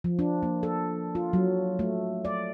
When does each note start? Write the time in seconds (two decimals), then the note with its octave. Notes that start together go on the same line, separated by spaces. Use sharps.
0.04 F3
0.19 D4
0.43 A#3
0.63 A4
1.15 F4
1.33 F#3
1.79 A3
2.25 D5